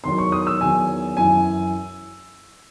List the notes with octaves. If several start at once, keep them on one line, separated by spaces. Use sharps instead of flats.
E2 D#3 F#3 C6
C#6
D#6
E6
E2 D#3 F#3 G#5
F#2 E3 G#5